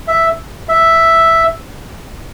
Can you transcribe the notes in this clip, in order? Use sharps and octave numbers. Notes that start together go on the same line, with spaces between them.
E5
E5